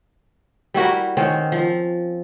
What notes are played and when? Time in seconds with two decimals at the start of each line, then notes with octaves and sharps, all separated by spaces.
0.74 G3 E4 F#4 A#4
1.17 D#3 C4 C#4
1.52 F3